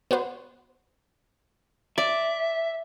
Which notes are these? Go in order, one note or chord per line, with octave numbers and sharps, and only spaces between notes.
B3 F#4 C5
D5 E5